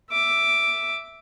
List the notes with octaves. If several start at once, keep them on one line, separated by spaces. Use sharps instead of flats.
E5 D6